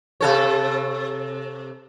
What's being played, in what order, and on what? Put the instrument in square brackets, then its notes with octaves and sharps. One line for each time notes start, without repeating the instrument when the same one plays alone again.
[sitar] C3 A4 C#5